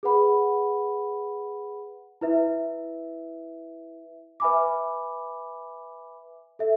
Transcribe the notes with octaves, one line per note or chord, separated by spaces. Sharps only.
G#4 B4 F#5 B5
E4 B4 E5
B4 E5 G#5 B5 D6
A4 E5